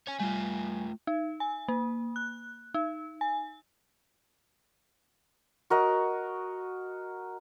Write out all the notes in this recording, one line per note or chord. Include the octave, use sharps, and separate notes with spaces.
C#5 G#5
G3 A3 F4 G#5
D#4
G#5
A#3
F#6
D#4
G#5
F#4 A#4 D#5